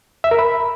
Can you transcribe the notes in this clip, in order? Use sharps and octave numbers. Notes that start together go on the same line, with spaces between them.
E5
A#4
B5